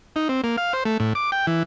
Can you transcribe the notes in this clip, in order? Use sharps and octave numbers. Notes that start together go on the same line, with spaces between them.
D#4
C4
A#3
F5
C5
A3
A2
D6
G5
E3